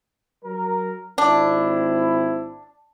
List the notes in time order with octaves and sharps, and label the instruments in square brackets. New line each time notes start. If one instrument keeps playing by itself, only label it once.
[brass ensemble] F#3 A#4
[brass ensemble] G#1 C4 E4 [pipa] D4